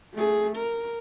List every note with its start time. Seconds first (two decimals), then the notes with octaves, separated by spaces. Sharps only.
0.14 A3 G#4
0.56 A#4